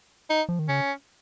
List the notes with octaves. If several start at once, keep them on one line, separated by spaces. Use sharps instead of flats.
D#4
F3
D#3
C#3 C#4